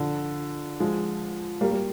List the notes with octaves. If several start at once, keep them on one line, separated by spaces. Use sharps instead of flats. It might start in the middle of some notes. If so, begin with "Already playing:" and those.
Already playing: D3 F3
F3 G#3
G3 A#3
G3